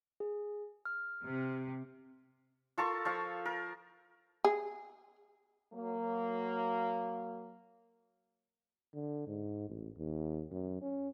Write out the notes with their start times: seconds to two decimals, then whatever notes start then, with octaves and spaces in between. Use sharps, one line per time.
0.20 G#4
0.85 F6
1.26 C3
2.78 F4 A4 A#4 C#6
3.05 F3 F5 C#6
3.46 A#4
4.44 G#4
5.73 F#3 A#3
8.94 D3
9.27 G#2
9.69 A1
9.98 D#2
10.51 F#2
10.81 C#4